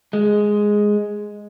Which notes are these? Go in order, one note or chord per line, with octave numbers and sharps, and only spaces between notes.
G#3